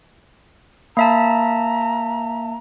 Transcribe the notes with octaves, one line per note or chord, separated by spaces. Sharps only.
A#3 E5 A5 A#5